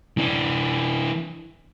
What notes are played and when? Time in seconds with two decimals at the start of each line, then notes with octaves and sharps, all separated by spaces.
0.17 E3 D4